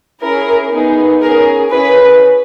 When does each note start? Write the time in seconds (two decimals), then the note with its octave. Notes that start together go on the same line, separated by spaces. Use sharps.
0.22 C#4 E4 G#4 A#4
0.71 B3 D#4 G#4
1.21 C#4 G#4 A#4
1.71 C#4 E4 G#4 B4